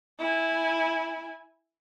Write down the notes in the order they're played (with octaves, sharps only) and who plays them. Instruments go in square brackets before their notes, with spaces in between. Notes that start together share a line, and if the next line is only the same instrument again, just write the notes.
[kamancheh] E4 G#5